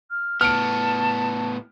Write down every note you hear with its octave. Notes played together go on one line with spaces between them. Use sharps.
F6
A2 B3 A5 F6 C#7 D7